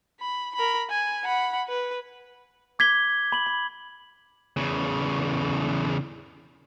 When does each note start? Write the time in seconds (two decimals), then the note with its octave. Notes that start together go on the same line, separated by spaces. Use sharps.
0.20 B5
0.55 A#4 B5
0.90 G#5
1.24 F#5 B5
1.69 B4
2.79 D6 G#6 B6 G7
3.32 B5 F#7
3.46 B5
4.57 E2 C#3